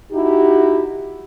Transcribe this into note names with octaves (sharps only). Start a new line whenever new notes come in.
D#4 E4 F#4 G4